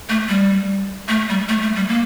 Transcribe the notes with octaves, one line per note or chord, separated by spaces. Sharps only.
A3
G3
A3
G3
A3
A3
G3
A#3